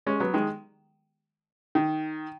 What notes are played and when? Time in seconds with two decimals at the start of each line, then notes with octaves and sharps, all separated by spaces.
0.07 G#3 C#4
0.20 F#3 B3
0.34 D#3 G#3
1.75 D#3